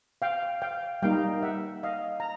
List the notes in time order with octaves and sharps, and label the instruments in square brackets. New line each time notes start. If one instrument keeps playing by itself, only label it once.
[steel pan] F5 G5
F5 G5
G3 A#3 D#4 F5 G5
E5 F#5
D#5 F5
A#5